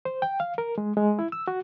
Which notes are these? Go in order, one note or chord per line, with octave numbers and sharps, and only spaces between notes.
C5
G5
F5
A#4
G#3
G#3
E4
E6
F#4